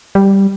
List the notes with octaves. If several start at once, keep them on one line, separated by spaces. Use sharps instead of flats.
G3